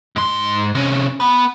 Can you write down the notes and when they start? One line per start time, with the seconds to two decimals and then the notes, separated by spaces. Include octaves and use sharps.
0.16 G#2 C6
0.75 C3 C#4
1.20 B3 B4